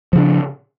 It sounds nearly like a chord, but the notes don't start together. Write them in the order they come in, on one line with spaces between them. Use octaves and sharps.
F3 C#3 D4